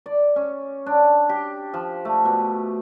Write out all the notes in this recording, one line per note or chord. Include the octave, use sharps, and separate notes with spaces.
D5
C#4
D4
G4
F3
A3
B2